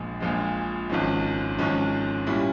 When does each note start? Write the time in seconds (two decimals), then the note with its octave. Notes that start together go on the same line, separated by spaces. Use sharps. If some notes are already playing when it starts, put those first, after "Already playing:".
Already playing: A#1 A#2 F3 G#3
0.20 A#1 A#2 F3 G#3
0.90 G#1 G#2 F3 G#3 C#4
1.58 G#1 G#2 F3 G#3 C#4
2.27 A#2 G3 C#4 E4